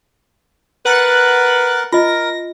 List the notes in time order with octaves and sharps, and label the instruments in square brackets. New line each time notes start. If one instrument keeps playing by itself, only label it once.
[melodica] A#4 [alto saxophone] B4 [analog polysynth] F#5 F#6 A6
[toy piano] F4 D#5 [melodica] A#4 [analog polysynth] A#6